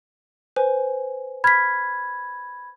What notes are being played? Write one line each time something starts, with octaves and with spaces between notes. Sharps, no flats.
B4 C5 G#5
B5 F6 G#6 B6